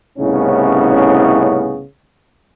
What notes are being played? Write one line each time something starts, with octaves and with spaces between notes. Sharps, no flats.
C2 A2 C#3 B3 C#4 D#4